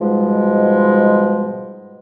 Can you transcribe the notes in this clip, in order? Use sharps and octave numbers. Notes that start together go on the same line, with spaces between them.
G#2 B2 F3 G3 G#3